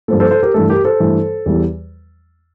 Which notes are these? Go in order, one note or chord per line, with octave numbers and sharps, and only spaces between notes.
G2 F3 A#3 A4
A4 C5
A4 C5
G4 A#4
G2 E3 A3 A4
G4 A#4
A4 C5
G2 E3 A3
E2 E3 G3